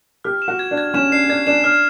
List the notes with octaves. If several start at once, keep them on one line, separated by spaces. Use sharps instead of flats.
G4 F6
E7
F#4
G#6
D4
G#6
C#4 E7
D4 C7
D4 G#6
D4 E7
D4 F6